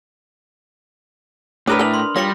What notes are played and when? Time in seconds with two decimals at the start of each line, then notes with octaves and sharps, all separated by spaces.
1.67 A2 C#4 D4 A#4 B4 D#6 F6
1.79 E3 A4 F7 F#7
1.94 C6
2.16 G3 F4 C#5 A#6 C#7